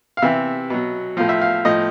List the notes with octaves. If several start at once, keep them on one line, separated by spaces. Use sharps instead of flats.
F5
C3 E3 E5
B2 F#3
A2 F3 F5
E5
F5
A2 F3 D#5